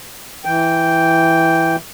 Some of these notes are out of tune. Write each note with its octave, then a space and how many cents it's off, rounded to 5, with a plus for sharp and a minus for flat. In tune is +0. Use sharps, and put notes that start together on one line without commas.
E3 +0 G5 +0